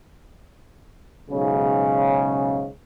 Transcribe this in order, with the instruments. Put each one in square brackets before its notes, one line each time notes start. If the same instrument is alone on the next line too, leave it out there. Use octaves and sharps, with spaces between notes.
[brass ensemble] B1 G#2 C#3